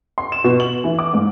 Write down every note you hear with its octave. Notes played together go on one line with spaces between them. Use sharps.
C6
E7
B2
F#7
E3
D6
G#2